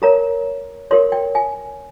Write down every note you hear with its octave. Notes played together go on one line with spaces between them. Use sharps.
G4 A#4 C#5 A#5
G4 A#4 C#5 C6
G5
G#5